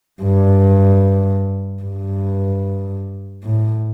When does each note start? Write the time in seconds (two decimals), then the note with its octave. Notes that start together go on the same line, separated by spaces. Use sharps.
0.22 G2
1.83 G2
3.44 A2